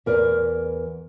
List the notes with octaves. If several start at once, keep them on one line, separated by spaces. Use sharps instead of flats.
E2 A#4 B4 D5